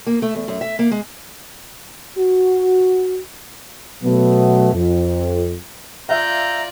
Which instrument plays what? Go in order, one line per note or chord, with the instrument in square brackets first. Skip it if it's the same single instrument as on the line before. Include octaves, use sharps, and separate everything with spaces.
[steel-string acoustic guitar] A#3
A3
E2
F#2
E5
A#3
G#3
[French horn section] F#4
[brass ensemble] B2 F#3 A3 B3
F2
[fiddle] F4 D5 [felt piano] E5 F5 [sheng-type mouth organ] A#5 [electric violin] G6